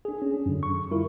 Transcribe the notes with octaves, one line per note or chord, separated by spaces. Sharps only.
D4 G#4
C#4
D4
F#2 D3
C#6
G3 E4 F4 A#4